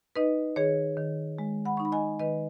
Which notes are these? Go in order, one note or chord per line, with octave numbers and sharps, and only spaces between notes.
D#4 B4 D#5
D#3 G#4 C#5
D#3
G#3
F#5 B5
D#4 C#6
B5
D#5 G#5
D#3 B4 D#5